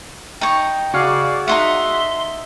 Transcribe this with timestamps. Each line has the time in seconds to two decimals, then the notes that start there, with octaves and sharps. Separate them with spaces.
0.41 D#4 G5 C#6
0.94 C#3 F#4 G#4 D5 F5
1.48 D#4 F4 E5 F#5 C6